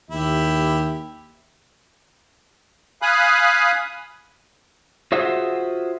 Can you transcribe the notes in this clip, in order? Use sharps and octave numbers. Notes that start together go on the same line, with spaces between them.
D#2 E4 G4
F5 G#5 B5 D#6 F#6
F4 F#4 G#4 C5 E5 F#5